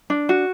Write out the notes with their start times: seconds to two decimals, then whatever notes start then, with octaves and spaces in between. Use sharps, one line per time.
0.10 D4
0.29 F#4